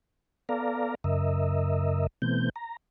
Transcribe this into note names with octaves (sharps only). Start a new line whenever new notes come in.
B3 A4 D5 F5 A#5
F#2 C#3 A#4 D#5 E5
B2 E3 A3 B3 C4 G6
A#5